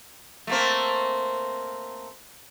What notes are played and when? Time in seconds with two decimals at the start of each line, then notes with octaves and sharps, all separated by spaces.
0.47 A3 A#3 C4